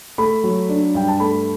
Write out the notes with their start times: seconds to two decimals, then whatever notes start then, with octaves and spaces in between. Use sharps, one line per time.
0.18 A3 B5
0.44 F#3
0.69 D4
0.95 G2 G5
1.08 A5
1.20 A3 B5